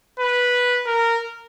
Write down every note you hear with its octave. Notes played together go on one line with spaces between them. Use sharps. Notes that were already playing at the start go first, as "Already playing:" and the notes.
B4
A#4